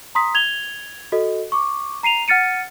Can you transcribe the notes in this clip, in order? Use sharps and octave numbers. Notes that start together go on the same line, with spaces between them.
A#5 C6 D#6 B6
G#6 F7 G7
F#4 A4 D#5
C#6 D6
A#5 C7 D#7 F7
F#5 F6 A6 C#7 D#7